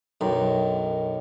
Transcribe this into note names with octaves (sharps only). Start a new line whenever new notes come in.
B1 F#2 D#3